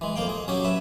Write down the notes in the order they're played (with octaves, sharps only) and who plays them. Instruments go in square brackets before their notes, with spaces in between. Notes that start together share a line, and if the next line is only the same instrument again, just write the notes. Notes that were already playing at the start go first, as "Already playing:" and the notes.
[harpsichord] E3 G#3
F2 A#3 F5 G5
G#4
F#3 C#4 G4 G#4
B4 E5